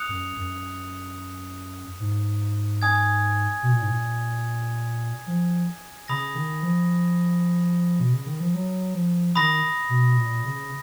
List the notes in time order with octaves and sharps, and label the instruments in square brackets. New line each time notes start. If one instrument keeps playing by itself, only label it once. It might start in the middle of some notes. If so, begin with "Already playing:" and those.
Already playing: [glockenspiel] D#6 F#6 C#7 F7
[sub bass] F#2
F#2
G#2
[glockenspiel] G#5 D#6 G#6
[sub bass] B2
A#2
G#2
A#2
F3
[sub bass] C#3 [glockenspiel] B5 D#6 A#6
[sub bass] D#3
F3
B2
C#3
D#3
F3
F#3
F3
[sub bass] D#3 [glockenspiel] B5 D#6 A#6
[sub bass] B2
A#2
C#3